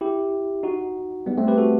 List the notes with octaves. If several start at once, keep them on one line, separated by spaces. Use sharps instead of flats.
E4 G4
D#4 F#4
G3 B3
A3 C4
G4 B4
F#4 A4